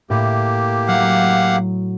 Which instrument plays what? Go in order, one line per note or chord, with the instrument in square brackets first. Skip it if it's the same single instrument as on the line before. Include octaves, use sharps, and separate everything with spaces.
[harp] A2 [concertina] A#3 G4
[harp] F#3 [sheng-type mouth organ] F5 F#5